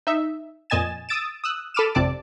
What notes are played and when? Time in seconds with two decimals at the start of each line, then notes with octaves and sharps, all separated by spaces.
0.07 D#4 E5
0.70 F2 A#2 D#5 G#5 A6 E7
1.09 D#6 E6 A6 D7 E7
1.44 D#6 E6 F#6
1.74 A4 B5 D6 F6 D#7 E7
1.95 G#1 F2 C3 D5 A5 D6